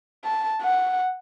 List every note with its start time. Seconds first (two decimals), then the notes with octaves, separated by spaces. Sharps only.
0.25 A5
0.62 F#5